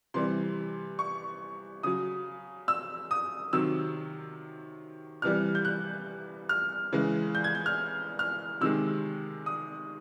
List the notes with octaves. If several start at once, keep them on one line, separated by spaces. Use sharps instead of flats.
C3 E3 G3 C6
C#6
C#3 F#3 D#6
E6
D#6
C3 D#3 F#3 E6
C3 E3 G3 F6
G6
F#6
F6
C#3 E3 G#3
G6
G#6
G6
F6
F6
C3 D#3 G#3 E6
D#6